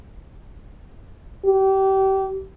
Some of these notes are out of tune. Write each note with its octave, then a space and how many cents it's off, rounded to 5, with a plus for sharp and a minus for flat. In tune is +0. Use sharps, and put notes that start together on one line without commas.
G4 -30